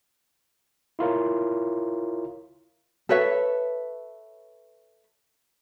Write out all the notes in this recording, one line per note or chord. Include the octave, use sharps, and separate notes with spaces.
E4 F4 A#4 C#5
A4 B4 C#5 E5